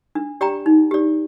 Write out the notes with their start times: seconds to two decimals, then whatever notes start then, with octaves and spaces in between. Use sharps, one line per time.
0.15 D4
0.41 G4 D5 G5 A#5
0.66 D#4
0.91 G4 D5